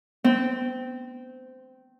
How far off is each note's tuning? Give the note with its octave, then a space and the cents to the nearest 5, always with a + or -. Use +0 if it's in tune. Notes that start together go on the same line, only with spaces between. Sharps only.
C4 -20